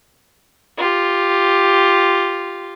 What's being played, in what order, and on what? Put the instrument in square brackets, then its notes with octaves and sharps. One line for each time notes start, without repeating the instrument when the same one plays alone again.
[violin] F4 G4